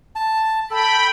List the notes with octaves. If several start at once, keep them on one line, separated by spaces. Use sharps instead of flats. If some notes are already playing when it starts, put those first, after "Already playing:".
A5
A4 G5 B5